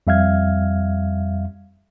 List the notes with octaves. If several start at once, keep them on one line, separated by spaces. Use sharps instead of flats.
F2 G3 E5 F5 F6 G#6